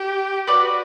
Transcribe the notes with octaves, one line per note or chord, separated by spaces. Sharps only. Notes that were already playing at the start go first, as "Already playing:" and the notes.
Already playing: G4
F#4 B4 D5